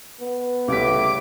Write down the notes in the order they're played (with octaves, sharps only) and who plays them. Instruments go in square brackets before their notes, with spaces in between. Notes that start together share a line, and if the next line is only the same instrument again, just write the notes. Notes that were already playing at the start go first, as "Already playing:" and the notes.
[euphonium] B3
[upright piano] C#2 G3 B6 [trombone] A2 [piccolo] D6